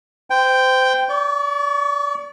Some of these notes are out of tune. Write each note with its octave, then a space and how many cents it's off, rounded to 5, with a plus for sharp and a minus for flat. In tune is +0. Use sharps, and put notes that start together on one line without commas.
C5 -25 G5 +0
D5 -30 C#6 +30